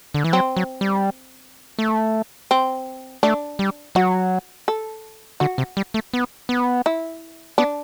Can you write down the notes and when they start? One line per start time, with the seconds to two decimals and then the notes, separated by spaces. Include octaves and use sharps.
0.14 D3
0.24 E3
0.33 F#3 C4
0.57 F#3
0.81 G3
1.79 A3
2.51 C4
3.23 A3 D4
3.59 G3
3.95 F#3 F#4
4.68 A4
5.40 D3 F#4
5.58 C3
5.77 G3
5.94 A3
6.14 B3
6.49 B3
6.86 E4
7.58 B3 D4